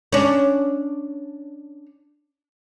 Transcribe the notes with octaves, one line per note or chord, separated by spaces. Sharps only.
C#4 D4